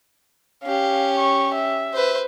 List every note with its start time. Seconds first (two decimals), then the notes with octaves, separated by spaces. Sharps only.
0.64 C#4 G4 F5
1.18 C#6
1.55 E5
1.94 B4 C5